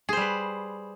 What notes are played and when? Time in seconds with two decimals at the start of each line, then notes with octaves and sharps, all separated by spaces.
0.09 G#4
0.13 C5
0.17 G3
0.21 B4